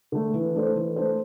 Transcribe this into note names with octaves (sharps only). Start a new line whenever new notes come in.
D3 A3
E3
A3 D4 A4 C5
E3
A3 D4 A4 C5